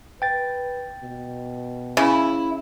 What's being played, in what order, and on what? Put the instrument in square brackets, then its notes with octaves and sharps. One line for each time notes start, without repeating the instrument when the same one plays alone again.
[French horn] B4 [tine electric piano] G5 A6
[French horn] B2
[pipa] C#3 [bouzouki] E4